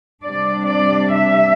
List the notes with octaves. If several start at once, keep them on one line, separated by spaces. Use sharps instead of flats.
C3 G3 D4 D5
D5
E5